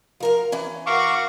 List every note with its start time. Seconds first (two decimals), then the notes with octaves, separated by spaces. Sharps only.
0.20 F3 A#4 F5
0.52 E3 C#4
0.86 F#4 A#4 F5 C#6 D6